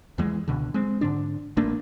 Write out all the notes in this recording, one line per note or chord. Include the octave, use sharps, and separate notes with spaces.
E2 E3 G#3
C#2 B2 D3
G#3 C4
G#2 D3 D4
A1 A3 A#3 D4